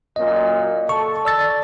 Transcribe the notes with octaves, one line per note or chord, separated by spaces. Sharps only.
F#2 A#2 D#5
A4 C#6
D5 E6 A6